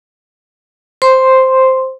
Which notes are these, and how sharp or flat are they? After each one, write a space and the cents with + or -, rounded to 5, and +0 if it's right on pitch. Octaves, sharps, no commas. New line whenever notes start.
C5 +0 C6 +0